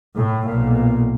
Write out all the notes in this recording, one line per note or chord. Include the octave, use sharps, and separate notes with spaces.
A2
B1 A#2